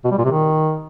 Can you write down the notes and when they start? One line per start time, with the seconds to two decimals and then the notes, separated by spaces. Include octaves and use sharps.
0.04 B2
0.11 G3
0.18 A#2
0.25 C3
0.31 D#3